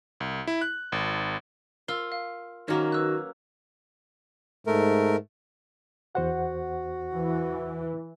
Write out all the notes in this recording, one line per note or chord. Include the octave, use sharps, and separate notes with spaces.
C2
E4
F#6
G#1
F4 A#4 E6
F5
D#3 F#3 A#3 C#4 F#4
B4 E6 F#6
G#2 A3 A#4
E2 F#4 C5 F#5
E3